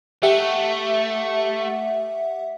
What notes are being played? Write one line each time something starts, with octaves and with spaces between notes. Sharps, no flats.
A3 G4 E5 F#5